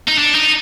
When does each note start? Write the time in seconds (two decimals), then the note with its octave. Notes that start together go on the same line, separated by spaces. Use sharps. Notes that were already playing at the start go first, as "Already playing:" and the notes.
0.08 D#4
0.19 D4
0.35 D#4